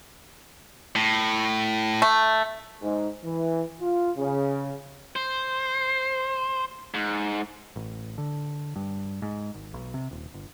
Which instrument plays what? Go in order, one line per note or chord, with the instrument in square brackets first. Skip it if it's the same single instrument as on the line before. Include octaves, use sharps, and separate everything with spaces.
[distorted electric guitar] A2
[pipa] A3
[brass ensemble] G#2
E3
F4
C#3
[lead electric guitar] C5
G#2
[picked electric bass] A1
D3
G2
G#2
G#1
B1
C3
D#1
G1